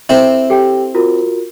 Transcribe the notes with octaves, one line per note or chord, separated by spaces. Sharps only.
C4 E4 A4 E5
G4 A4 G5
F4 F#4 A#4